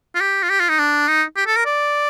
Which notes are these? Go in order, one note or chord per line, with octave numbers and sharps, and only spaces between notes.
F4
G4
F4
G4
F4
D#4
D4
D#4
G4
A4
A#4
D5